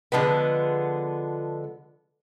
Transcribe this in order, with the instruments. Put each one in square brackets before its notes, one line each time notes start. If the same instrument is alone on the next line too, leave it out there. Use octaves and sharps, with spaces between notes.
[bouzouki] D3 F3 G#3 B3